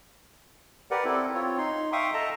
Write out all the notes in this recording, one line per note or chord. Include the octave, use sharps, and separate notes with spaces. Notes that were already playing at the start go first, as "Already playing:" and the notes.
G4 A#4 B4 D5 F#5
C4 E4 A4
C4 F4 C#5
D#4 C6
E5 F5 G5 C6 C#6 D#6
A4 D#5 E5 G5 A5 A#5